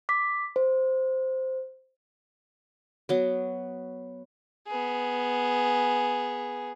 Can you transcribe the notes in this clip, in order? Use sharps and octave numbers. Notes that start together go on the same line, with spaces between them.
D6 B6
C5
F#3 B3
B3 G#4